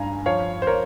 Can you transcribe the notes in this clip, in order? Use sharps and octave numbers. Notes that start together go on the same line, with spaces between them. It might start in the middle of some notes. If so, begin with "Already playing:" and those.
Already playing: G2 F5 G#5 A#5
F3 C#5 F5
C5
A#4 C#5